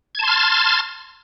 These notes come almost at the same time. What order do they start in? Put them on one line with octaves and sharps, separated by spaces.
G#6 A5 C6 F6 A6